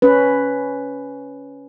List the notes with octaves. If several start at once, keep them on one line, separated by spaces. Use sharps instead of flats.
C#4 B4